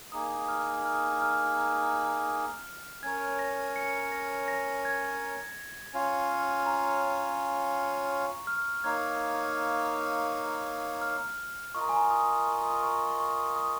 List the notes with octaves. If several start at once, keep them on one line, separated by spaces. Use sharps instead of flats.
A#3 D#4 G#4 D#6
F6
F6
F6
C#4 A#4 C#5 G#6
A#6
C#7
A#6
A#6
G#6
C#4 F4 C#5 F5
A#5
C#6
F6
A#3 D#4 C#5 F5 G#6
F6
F4 A#4 D#5 C#6
A#5
G#5
A#5
D#6
C#6
C#6
C#6
D#6